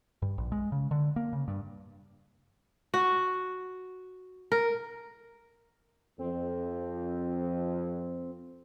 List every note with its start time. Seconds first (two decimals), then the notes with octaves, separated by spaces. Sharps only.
0.22 G2
0.38 A#1
0.52 G#3
0.72 C#3
0.91 D3
1.16 A#3
1.33 C#3
1.48 G2
2.94 F#4
4.52 A#4
6.19 F2 C4